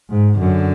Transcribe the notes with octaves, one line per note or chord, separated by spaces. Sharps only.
G#2
F#2 D3